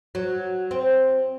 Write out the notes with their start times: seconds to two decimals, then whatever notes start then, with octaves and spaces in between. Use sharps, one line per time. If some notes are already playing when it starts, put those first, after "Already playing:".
0.15 F#3
0.71 C4